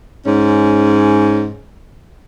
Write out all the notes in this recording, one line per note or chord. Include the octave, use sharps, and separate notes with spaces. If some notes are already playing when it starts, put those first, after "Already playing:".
G#2 C#4